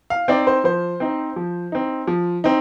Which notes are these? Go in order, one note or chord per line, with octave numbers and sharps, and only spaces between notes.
F5
C4 D#4 D5
C5
F3 C5
C4 D#4
F3
C4 D#4
F3
C4 D#4